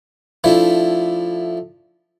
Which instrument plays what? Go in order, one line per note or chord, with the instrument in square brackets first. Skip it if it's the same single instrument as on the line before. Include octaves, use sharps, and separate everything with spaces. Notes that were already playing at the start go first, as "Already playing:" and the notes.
[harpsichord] F3 A3 D4 E4